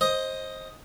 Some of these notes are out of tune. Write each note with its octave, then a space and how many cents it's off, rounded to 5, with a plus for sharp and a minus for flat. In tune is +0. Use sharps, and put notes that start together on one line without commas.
C5 +15 D#5 +5